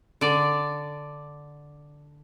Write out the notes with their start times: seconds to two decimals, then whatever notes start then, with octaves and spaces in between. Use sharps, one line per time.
0.21 D3 D5